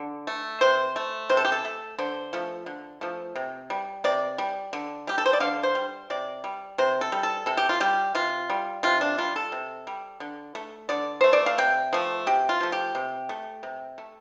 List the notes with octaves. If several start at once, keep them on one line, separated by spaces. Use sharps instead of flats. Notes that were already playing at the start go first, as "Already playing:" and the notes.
Already playing: D3
A3
C3 C5
A3
C3 C5
A4
G4
A4
A3
D3 C5
F3 A3
D3
F3 A3
C3
G3
C3 D5
G3
D3
G3 G4
A4
C5
D5
D3 F5
C5
G3
C3 D5
G3
C3 C5
A4
G3
A4
C3 A4
G4
F4
G3 G4
C3 F4
G3
C3 F4
D4
G3 F4
A4
C3
G3
D3
A3
D3 D5
A3 C5
D5
F5
C3 G5
F3 A3
C3 G4
F4
F3 A3
G4
C3
A3
C3
A3